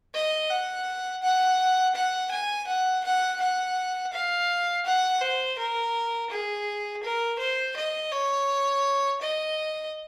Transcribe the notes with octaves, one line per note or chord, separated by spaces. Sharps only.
D#5
F#5
F#5
F#5
G#5
F#5
F#5
F#5
F5
F#5
C5
A#4
G#4
A#4
C5
D#5
C#5
D#5